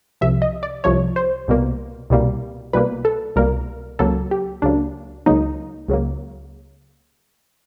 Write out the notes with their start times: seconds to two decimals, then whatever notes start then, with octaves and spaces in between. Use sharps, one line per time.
0.21 C2 C3 F3 E5
0.42 D#5
0.63 D5
0.84 C2 C3 F3 C#5
1.16 C5
1.48 C2 B2 G3 A#3
2.10 C2 B2 G3 A#3
2.73 C2 B2 G3 A#3 B4
3.05 A4
3.36 C2 B2 G3 A#3 A#4
3.99 C#2 C#3 F#3 A#3 A4
4.31 G4
4.62 C#2 C#3 F#3 A#3 D4
5.26 C#2 C#3 F#3 A#3 D#4
5.88 C#2 C#3 F#3 A#3